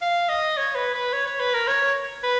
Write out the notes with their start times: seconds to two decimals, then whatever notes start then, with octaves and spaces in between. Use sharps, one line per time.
0.02 F5
0.29 D#5
0.57 C#5
0.75 B4
0.94 B4
1.13 C#5
1.27 C#5
1.40 B4
1.54 A#4
1.67 C#5
2.23 B4